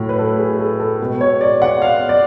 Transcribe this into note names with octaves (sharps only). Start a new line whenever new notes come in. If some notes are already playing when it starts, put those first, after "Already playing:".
Already playing: A2 F#3 A3
B4
A4
G#4
A4
A4
B2 G#3 B3 B4
C#5
D5
F#5
F5
D5